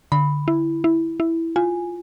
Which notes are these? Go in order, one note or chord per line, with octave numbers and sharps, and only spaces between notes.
D3 B5
E4
E4
E4
F4 G#5